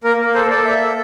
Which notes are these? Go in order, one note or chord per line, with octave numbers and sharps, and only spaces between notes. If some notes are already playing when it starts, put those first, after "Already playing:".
A#3 A#4
A#3
A4 C5
A4 D5
A#3 E5
A4